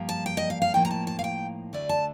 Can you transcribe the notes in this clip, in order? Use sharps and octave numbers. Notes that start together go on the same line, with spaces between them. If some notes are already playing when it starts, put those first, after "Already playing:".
Already playing: G2 F3 A#3
A5
G5
D#5
F5
F5
A2 F3 A#3 D#4 G5
A#5
A5
A5
F5
G5
D2 D3 A3 D5
A5